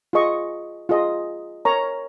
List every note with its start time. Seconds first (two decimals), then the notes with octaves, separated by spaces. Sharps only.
0.13 F4 G#4 D#5 C#6
0.89 F4 G#4 D#5
1.65 A#4 C#5 A#5 C#6